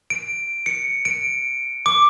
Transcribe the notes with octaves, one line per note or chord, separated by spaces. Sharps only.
D7
C#7
D7
D6